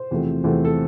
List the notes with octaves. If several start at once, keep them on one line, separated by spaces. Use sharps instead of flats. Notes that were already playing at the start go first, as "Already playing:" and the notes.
Already playing: C5
E2 C3 F3 A3 C4
E2 C3 F3 A3 C4
A4